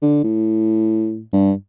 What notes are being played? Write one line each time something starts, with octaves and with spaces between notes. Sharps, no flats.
D3
A2
G2